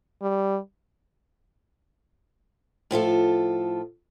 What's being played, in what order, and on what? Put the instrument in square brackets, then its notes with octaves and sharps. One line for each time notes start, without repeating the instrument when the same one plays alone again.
[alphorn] G3
[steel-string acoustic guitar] A2 F3 F4 A4